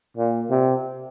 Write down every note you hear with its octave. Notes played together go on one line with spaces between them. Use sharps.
A#2
C3